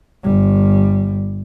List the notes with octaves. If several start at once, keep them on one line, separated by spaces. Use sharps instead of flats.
G1 G3